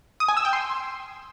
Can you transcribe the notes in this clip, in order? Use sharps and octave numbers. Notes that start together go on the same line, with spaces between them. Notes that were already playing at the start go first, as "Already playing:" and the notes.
D#6
G#5
E6
G5
C6